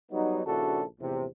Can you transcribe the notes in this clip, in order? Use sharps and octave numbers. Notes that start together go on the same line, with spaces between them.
F#3 G3 B3 D#4
A#1 C#3 D4 E4 F#4 A4
A#1 E2 A2 C3